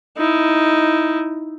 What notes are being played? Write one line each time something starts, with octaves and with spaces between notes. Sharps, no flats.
D#4 E4